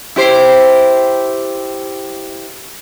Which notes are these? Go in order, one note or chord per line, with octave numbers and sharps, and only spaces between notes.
E4 G4 C5